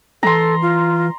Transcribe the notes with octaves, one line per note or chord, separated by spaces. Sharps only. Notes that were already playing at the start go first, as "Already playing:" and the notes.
E3 A4 A#5 C6
F4